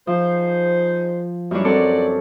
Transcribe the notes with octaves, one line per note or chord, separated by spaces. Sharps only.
F3 D#4 G#4 C5
F#2 E3 G3 D4 F4 C#5
C4 F#4 A4 A#4 C#5 D5